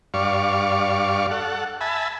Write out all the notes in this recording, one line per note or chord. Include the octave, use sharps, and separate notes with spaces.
G2 D5 F5 C#6
A4 F#5
E5 G#5 A5 B5